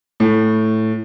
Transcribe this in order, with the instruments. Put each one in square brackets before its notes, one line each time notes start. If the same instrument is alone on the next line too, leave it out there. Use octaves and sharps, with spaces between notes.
[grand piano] A2